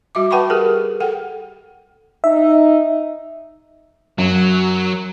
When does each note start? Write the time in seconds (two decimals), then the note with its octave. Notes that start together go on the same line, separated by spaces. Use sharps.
0.15 G3 F#4 E5 D6
0.31 B4 F#5 G5 A5 B5 C#6
0.50 G4 G#4 A#4
1.00 A4 F#5 G5
2.24 D#4 E5
4.18 F#2 F#3